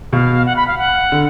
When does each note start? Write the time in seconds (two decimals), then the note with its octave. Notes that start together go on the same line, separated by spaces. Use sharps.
0.13 B2 F5
0.46 F#5
0.56 B5
0.68 F5
0.78 F#5
1.12 D3